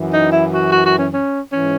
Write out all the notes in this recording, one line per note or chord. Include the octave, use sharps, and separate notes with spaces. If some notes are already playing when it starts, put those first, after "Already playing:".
Already playing: F#2 E3
D#4
E4
F#4
F#4
F#4
C#4
C#4
G#2 E3 C#4